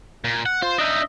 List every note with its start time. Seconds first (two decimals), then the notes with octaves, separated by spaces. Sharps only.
0.24 A#2
0.46 F#5
0.62 F4 C5
0.79 D4 D#4 D#5 E5